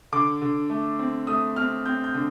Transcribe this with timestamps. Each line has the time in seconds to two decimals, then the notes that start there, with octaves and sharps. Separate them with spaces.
0.12 D3 D6
0.41 D3
0.70 A3
0.99 C4
1.27 A3 D#6
1.56 C4 F6
1.86 C4 G6
2.04 G6
2.14 D3